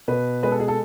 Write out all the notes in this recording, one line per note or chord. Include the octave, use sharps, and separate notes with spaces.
B2 B4
G#3 B4
A4
G#4
A4